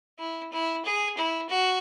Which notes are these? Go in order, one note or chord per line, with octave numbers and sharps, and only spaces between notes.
E4
E4
G#4
E4
F#4